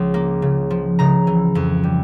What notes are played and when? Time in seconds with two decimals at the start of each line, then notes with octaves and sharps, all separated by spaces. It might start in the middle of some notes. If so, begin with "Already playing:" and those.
Already playing: C#2 C#3 F3
0.14 A#3
0.42 C#3
0.71 F3
0.99 C#3 A#5
1.27 E3
1.55 F2
1.84 G3